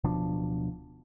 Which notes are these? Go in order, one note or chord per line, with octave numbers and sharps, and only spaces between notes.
D1 B2 F3 D4